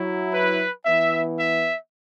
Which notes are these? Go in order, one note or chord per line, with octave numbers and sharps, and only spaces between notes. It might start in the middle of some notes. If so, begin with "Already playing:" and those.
Already playing: F#3 E4
B4
E3 B3 E4 E5
E5